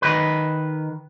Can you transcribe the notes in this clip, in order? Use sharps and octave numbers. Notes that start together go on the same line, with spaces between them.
D#3 B4